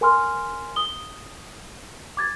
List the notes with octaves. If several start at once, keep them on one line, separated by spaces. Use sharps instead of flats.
A#4 G#5 C6 F6
D#6 G7
D6 G#6 A6